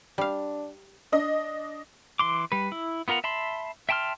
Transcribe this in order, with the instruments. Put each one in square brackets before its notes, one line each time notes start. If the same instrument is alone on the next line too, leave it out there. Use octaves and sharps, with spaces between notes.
[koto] G3 F5 [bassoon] D4
[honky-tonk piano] D4 D#5
[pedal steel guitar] E3 C6 D6
G3 B4
E4
B3 F4 A#4 F#5 A#5
E5 A5 B5 C6
E5 G5 A5 C6 F6